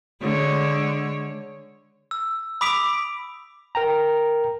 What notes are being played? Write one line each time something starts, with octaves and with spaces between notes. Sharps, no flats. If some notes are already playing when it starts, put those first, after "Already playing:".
D3 G#3 C#5
E6
B5 D6 D#6 B6 D7 F7
A#4 G5 A#5